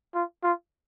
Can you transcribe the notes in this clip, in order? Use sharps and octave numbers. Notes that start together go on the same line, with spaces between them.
F4
F4